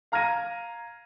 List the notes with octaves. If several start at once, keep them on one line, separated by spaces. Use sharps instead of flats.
F5 A#5 F6 G#6 A#6 D#7